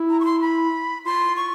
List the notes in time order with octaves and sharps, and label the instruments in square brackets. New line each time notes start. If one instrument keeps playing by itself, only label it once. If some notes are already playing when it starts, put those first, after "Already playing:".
Already playing: [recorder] E4
[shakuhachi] A#5
C#6
C6
B5
[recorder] F4 [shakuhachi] C6
[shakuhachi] C#6